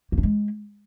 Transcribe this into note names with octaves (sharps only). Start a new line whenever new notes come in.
A#3
D4
G#3